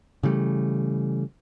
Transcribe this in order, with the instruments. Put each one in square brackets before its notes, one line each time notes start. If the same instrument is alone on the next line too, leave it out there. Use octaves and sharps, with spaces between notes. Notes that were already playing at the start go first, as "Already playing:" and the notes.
[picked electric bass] C#3 E3 G3 A3